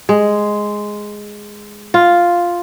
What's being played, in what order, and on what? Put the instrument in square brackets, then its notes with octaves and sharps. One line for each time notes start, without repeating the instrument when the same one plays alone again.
[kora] G#3
F4